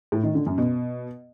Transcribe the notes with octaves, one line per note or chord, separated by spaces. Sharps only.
A2
D#3
D3
F#2
B2